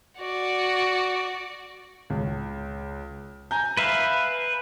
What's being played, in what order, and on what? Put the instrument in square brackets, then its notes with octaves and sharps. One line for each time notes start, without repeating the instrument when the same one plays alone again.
[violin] F#4 D5
[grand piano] C#2
G#5 A#5 G6
[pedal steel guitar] B4 E5 F5